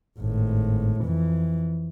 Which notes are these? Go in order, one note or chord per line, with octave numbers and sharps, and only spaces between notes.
G#1 A2
F2 E3